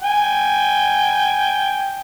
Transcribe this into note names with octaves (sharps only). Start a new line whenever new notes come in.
G5 G#5